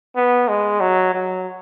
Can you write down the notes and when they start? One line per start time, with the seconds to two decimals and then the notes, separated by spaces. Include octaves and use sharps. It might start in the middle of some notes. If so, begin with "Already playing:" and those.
0.16 B3
0.49 G#3
0.81 F#3
1.14 F#3